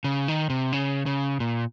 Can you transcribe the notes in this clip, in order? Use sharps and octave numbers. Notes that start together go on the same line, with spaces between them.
C#3
D#3
C3
C#3
C#3
A#2